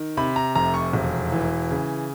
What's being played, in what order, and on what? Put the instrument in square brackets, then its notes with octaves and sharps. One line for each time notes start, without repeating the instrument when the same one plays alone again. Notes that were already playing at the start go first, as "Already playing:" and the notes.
Already playing: [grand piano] D#3
C3 B5
A#5
F1 A#5
C#6
E1
E3
C#3